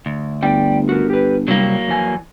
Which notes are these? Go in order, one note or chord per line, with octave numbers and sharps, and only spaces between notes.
D2
G1 D5 G5
F#4 A#4
G4 B4
C3 F#3 G3 A#3 E4
F2 E3 G#5